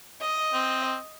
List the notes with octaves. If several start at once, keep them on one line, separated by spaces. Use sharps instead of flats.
D#5
C4